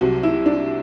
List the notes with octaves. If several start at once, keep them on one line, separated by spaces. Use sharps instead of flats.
C2 C3 F#3 F#4
E4
D4